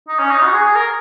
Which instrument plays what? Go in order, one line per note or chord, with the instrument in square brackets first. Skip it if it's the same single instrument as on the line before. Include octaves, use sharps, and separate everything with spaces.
[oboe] D#4
C#4
D#4
F#4
G#4
G#4
A#4